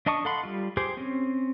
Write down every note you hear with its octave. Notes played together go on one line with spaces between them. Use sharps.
D4 D#5 A5 C#6 D#6
A4 F5 F#5 B5 C6
G3 F4
G4 G#4 C5
C4 C#4